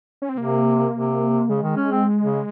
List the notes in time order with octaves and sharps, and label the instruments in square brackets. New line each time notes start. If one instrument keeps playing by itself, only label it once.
[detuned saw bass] C#4
C4
[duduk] C3 [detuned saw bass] A#3
[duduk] C3
[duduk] C#3 [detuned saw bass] G#3
[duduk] D#3
C#4
C4
C#3